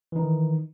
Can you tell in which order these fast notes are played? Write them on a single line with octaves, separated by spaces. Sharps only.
E3 D#4 D#3